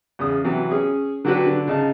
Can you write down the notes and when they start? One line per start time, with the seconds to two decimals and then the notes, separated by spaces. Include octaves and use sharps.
0.19 E2 C#3 D#6
0.44 C3 E3 F#3
0.71 C#4 G#4
1.25 D3 F#3 D4 F#4 G4 B4
1.46 D3
1.67 C#3 D#4 A5